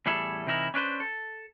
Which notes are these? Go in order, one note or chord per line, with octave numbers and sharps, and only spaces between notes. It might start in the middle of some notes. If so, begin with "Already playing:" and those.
E2 A2 G3 E4 G#4 A4
C3 E3 D#4 E4 A#4
C#4 D4 B4 C5
A4